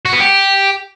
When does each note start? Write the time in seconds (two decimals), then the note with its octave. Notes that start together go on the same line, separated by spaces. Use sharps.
0.05 F#4
0.13 B3
0.20 G4